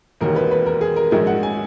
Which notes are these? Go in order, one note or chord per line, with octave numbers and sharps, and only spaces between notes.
E1 D#2 D#3 A#4
B4
B4
A#4
G#4
A#4
A#1 G#2 D#3 F#3 G#4
F#5
G#5